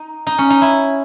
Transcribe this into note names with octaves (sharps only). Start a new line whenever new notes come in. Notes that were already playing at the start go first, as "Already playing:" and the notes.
Already playing: D#4
D#4
C#4
D#4
E4